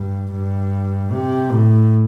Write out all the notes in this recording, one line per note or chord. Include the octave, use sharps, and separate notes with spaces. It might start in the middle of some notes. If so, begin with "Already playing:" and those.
Already playing: G2
G2
C3
A2